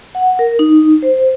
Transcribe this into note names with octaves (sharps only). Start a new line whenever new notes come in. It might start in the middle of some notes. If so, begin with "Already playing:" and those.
F#5
A#4
D#4
C5